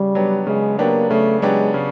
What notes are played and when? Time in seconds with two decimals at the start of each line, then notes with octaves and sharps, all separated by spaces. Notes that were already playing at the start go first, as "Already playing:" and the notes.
Already playing: C#3 G3
0.15 F#3 B3 D4 G4
0.46 C#3 G#3
0.78 F#3 A#3 B3 D4 G4
1.10 C#3 A3
1.42 F#3 G#3 B3 D4 G4
1.74 C#3